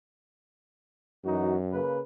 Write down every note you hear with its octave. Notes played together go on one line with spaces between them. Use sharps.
F#2 E3 D#4 F#4
C#3 A#3 B4